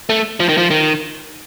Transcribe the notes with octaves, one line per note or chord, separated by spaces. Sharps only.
A3
F3
D#3
F3
D#3